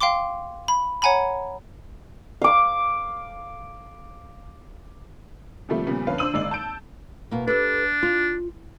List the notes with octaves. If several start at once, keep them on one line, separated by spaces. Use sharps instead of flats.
F5 G5 C6 D6
B5
C#5 F#5 G#5 A#5 B5
F5 D6
C3 D#3 F3 G3 A3 A#3
A#2 C#3 F3 G3 B3
F2 D3 C#4 B4 F5
D4 C5 E6 D#7 F#7
G#1 G#3 D5 F#7
A5 G6 D7
B2 A#3
D4 G4 A4 B4
F4